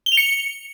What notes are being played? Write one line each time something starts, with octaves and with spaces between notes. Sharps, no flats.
G7
F7
C#7